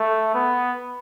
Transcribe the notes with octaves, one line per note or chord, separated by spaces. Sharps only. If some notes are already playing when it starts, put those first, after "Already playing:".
Already playing: A3
B3